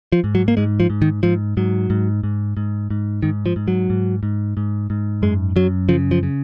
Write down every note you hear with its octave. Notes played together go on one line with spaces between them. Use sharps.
F3
G#2
F#3
A#3
G#2 G#3
F3
G#2
D#3
G#2 F3
G#2 F#3
G#2
G#2
G#2
G#2
G#2 D#3
F3
G#2
F#3
G#2
G#2
G#2
G#2
F#2 G#3
F#2 F#3
C#3 F3
F3
C#3